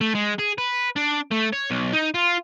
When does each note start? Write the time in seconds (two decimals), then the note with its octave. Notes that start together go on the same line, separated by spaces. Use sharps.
0.01 A3
0.15 G#3
0.39 G#4
0.58 B4
0.96 D4
1.31 A3
1.53 C#5
1.70 B1
1.93 D#4
2.14 F4